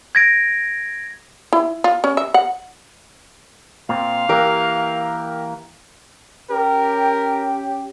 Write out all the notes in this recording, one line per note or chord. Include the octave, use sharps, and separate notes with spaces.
G#6 A#6 D7
E4
F4
C#4
E5
F#5
A#2 C4 F5
E3 A#3 G4 A#4
C#4 G4 A#4